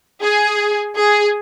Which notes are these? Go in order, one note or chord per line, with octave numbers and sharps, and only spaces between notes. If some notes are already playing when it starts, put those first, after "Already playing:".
G#4
G#4